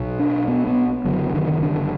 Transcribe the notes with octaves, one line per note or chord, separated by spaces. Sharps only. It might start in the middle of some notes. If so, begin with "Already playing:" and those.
Already playing: B1 B2
D4
B3
B3
F#1 F#2 D3 F#3
D#3
D3